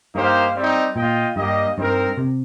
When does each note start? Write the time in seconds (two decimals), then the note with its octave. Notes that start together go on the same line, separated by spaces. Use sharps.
0.15 G2 A#3 D#4 G4 C5 F5
0.56 G3 C4 D#4
0.96 A#2 F4 D#5 G5
1.36 G2 G3 A#3 G4 D#5
1.77 G2 C4 D#4 A#4
2.17 C3